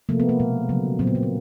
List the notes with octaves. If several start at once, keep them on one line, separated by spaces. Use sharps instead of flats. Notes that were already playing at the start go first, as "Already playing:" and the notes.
C3 F3 A3 A#3
B3
A#3
B2 G#3
C#3 F#3 A3
A#2 F#3 A#3 C4
B3
A#3
B3